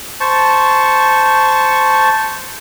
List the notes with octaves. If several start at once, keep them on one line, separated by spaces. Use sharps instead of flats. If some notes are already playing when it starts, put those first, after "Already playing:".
C5 A5 C#6